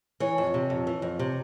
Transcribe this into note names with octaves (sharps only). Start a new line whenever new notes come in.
E3 C#5
F2
C3
F2
E3
F2
C3